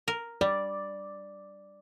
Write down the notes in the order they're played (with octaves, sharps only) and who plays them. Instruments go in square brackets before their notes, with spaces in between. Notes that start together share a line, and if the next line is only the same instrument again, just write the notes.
[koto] A#4
[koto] G3 [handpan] D5